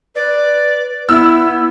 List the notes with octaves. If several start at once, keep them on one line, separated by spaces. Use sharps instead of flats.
B4 D5
B3 E4 E6